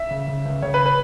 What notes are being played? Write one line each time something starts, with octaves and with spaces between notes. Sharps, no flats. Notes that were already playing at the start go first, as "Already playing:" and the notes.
Already playing: E5
C#3
C#3
C#2
C#3 C#5
B4
B4